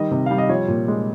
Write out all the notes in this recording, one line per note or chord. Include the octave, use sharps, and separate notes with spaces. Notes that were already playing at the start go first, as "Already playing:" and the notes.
Already playing: D#3 G3 D#5
C3
G3 F5
D#5
F3 C#5
A#2
G#3